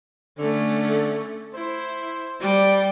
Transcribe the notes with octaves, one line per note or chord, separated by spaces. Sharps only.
D3 A3 C#4
E4 C5
G3 G5